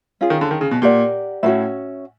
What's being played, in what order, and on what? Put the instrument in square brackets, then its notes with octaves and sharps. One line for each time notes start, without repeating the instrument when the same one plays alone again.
[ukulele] C#4 F4 G#4
[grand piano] D#3
D3
D#3
C#3
B2
[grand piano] A#2 [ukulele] G4 A#4 D5 F#5
[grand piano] A2 [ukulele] C#4 F#4 B4 E5